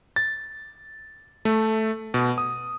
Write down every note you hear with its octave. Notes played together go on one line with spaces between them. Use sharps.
A6
A3
B2
D#6